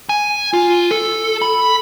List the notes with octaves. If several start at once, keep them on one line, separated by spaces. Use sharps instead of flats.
G#5
F4
A4
B5